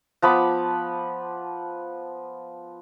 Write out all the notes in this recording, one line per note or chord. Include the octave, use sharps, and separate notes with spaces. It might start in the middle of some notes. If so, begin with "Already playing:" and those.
F3 B3 B5 D6